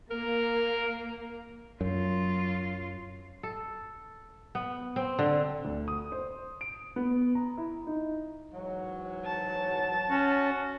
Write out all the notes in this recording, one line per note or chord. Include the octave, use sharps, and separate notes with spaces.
A#3 A#4
F#2 F#3 F4
A4
B3
C4
D3
D2
D#6
C5
D7
B3
A#5
E4
D#4
G#2 E3 F#3
A5
C#4 F#4